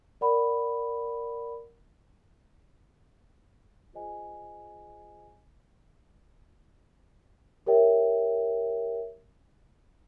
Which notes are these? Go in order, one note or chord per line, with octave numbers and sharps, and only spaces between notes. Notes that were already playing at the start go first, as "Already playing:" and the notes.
A#4 D5 F#5 B5
F4 G#4 C5 D#5 G#5
G4 A#4 C#5 E5 G5